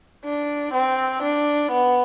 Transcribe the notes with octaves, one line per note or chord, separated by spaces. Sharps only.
D4
C4
D4
B3